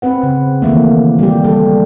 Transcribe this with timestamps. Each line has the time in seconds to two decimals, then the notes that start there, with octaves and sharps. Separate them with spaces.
0.02 C4 B4 F#5
0.23 C#3
0.62 D#3 E3 A3 A#3
1.19 G3 G#3 G4
1.44 G3 G4 A4